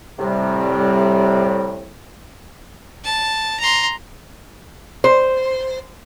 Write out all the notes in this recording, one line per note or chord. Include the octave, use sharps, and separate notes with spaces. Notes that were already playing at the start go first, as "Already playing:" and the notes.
A2 C3 G3
A5
A#5 C6
C5